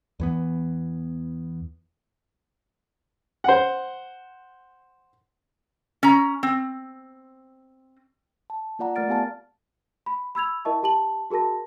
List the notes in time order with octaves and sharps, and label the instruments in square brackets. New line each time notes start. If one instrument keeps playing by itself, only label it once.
[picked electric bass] E2 E3 B3
[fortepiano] C5 F#5
[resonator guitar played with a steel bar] C#4 A#5
C4
[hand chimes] A5
A#3 F4 D5 F#5 A#5
A3 A#4 D5 F6 A6 D7
B3 G4 F5 G#5 A5 F6
[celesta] B5
B5 E6 G#6 F7
E4 A#4 D#5 E5 A5 C#6
G4 A5 F#7
F#4 G#4 A#4 A5 A#6